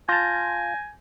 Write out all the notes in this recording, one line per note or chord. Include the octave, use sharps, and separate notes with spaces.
F4 G#5 A5 G6 A#6